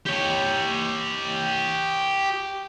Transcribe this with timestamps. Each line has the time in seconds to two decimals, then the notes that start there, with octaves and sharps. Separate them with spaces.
0.06 G4 C#5